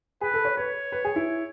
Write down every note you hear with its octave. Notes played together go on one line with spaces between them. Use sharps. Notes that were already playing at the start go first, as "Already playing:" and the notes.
G#4 B4
A4
C#5
B4 C#5
B4
G#4
E4